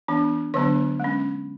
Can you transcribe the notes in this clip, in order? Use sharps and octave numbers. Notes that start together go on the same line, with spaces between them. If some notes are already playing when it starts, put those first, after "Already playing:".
E3 B3 D4
D3 F#3 B3 D4 C#5
G#3 C#4